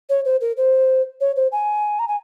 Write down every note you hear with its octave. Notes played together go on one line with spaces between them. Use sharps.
C#5
C5
A#4
C5
C#5
C5
G#5
A#5
G#5